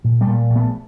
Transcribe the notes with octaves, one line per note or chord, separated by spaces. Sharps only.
A#2
G3 A3
A#2
A#1
A3 B3